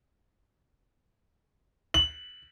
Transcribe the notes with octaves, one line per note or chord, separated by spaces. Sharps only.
F#7